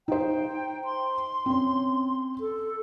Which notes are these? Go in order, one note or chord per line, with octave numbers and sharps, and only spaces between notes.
D#4 C5 G5
C6
C4 C#4
A4